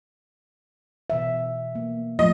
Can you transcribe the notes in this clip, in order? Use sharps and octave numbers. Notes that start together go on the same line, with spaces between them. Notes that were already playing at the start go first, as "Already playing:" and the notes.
B2 E3 E5
A#3
F3 F#3 A3 D#5